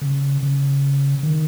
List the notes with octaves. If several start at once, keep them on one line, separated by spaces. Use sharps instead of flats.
C#3
C#3
D#3